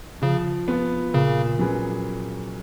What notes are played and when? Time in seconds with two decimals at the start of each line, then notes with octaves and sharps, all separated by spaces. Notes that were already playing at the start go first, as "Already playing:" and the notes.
0.22 C#3 F3
0.68 B3 F4
1.14 A#2 C#3
1.59 F#3 C#4 G#4 B4